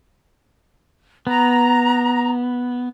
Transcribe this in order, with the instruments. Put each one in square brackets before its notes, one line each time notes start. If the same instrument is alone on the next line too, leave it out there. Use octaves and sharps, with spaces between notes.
[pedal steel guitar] B3 [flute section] A#5